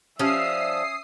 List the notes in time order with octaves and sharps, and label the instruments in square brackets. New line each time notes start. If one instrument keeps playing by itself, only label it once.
[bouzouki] F3 G3 [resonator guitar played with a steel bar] C#4 [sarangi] E5 [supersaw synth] D#6 C7